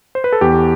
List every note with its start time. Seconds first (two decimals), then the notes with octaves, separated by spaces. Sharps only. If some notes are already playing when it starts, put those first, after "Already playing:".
0.15 C5
0.24 B4
0.33 A4
0.41 E2 G4